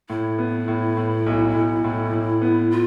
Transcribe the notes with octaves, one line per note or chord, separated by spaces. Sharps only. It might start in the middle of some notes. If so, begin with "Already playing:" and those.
A2 E4
B3
A2
A2
B1
B1
A2
A2
B3
F4